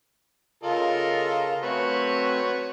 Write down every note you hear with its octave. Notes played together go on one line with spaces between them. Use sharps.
C#3 F4 A4 A#4 D#5
A3 C4 F#4 B4 C#5